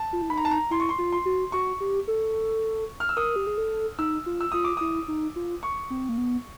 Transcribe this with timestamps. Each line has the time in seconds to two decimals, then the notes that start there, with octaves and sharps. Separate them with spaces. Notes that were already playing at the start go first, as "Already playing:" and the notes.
Already playing: A5
0.13 F4
0.22 E4
0.30 D#4 B5
0.37 A#5
0.45 A5
0.51 A#5
0.71 E4 C6
0.80 C#6
0.89 C6
0.98 F4
1.12 C6
1.25 F#4
1.52 F#4 C#6
1.80 G4
2.08 A4
3.00 F6
3.09 E6
3.17 A#4 D#6
3.36 G4
3.47 G#4
3.58 A4
3.99 D#4 E6
4.26 F4
4.41 E6
4.52 F4 D#6
4.64 D6
4.77 E4 D#6
5.08 D#4
5.36 F4
5.63 C#6
5.90 C4
6.09 A#3
6.18 B3